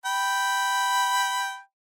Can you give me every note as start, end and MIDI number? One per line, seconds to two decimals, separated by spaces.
0.06 1.58 79
0.06 1.58 83